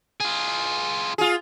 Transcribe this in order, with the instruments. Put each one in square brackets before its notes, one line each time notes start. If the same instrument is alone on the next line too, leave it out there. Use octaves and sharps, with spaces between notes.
[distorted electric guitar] F4 G#4
[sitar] F4 G#4